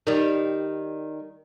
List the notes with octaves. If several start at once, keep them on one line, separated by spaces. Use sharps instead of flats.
D#3 G3